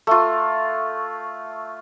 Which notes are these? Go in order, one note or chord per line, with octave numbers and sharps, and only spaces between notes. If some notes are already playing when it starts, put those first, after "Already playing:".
A3 F4